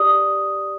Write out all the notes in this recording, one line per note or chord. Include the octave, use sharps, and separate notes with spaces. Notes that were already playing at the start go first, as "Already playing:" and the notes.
Already playing: G4 D5 D#6